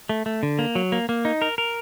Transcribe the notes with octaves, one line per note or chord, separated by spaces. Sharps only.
A3
A3
D3
A#3
F#3
A#3
A#3
D#4
A#4
A#4